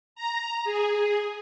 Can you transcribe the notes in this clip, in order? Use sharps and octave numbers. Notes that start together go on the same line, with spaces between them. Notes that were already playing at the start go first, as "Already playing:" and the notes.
A#5
G#4